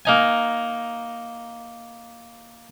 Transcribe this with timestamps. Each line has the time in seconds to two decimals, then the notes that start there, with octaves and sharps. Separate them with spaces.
0.05 A#3 D#4 G#5